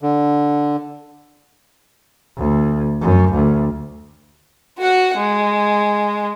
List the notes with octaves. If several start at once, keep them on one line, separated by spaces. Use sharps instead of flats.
D3
D2
F#2
D2
F#4 F#5
G#3